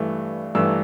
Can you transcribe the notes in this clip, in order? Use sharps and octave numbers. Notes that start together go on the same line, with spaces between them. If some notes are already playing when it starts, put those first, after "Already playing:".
Already playing: G2 E3 A3
G2 E3 A3 E6